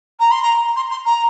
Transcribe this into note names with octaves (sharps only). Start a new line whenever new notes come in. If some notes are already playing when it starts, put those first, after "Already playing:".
A#5
C6
A#5
C6
C6
A#5